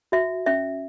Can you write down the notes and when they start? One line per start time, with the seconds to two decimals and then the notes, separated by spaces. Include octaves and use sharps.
0.12 F#4 E5
0.46 C#4 E5